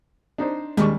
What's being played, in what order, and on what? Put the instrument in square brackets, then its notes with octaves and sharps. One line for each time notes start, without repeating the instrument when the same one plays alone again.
[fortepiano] D4 D#4 C5
[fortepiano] D#2 G3 C#6 [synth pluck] G#3 D4